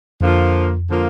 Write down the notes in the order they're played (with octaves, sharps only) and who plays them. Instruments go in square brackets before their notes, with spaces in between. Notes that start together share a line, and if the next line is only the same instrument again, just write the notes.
[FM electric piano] F2 [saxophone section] D3 F3 A#3 F4
[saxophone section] D3 F3 A#3 F4